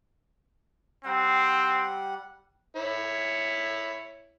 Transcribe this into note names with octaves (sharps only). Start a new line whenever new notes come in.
G3 C4 F#5
E4 C#5